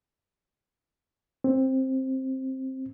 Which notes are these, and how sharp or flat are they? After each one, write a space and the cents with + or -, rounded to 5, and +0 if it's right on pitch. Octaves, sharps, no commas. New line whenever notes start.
C4 +10